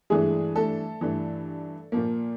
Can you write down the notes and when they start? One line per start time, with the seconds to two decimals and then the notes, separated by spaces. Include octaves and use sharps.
0.10 G2 E3 G#3 A3 G#4
0.56 A3 A4
1.01 G2 E3 A3
1.92 A#2 F3 A#3